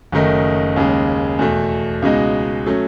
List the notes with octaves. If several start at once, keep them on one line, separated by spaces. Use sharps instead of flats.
F#1 F#2 D#3 A3 D#4
D#2 C#3 G#3
E2 B2 A3
C#2 B2 G#3 D#4
F#3 A3 C#4